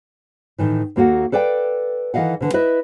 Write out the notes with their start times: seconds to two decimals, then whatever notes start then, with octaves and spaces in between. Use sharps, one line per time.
0.58 A2 D#3 E3
0.96 D#2 A#3 F#4 A4 F#5
1.32 A4 B4 D5 F5 G5
2.14 D#3 E3 A4 D#5 F5 F#5
2.40 B2 D3 E3
2.54 E4 B4 D#5 E5